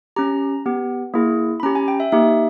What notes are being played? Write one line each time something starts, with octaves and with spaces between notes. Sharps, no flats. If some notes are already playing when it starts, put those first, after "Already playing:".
C#4 G4 A#5
B3 G4
A#3 E4 G#4
B5
C#4 G4 A#5
G#5
G5
E5
A#3 D#4 G4 E5